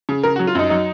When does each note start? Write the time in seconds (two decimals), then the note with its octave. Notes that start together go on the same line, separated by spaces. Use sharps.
0.09 C#3
0.23 C#3 A#4
0.36 F#4
0.39 F#3
0.47 F4
0.55 F#2 D#4
0.70 F#3 D#4